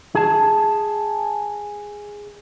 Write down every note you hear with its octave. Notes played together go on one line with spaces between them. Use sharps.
G#4 A5